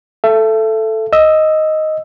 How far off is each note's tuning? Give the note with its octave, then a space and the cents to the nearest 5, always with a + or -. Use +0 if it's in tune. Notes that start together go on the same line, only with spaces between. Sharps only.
A4 +0 E5 +30
D#5 +5 E6 +0